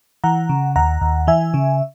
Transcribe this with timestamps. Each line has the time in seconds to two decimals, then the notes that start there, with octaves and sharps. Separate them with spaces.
0.24 E3 F#5 A#5
0.49 C#3
0.76 D#2 F#5 A#5
1.01 D#2
1.27 E3 E5 G#5
1.54 C#3